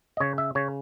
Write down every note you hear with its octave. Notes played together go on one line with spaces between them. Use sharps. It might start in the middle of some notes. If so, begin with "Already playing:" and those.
D#5
C#3 C#5
E5
C#3 C#5